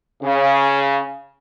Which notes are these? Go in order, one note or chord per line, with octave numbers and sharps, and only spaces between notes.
C#3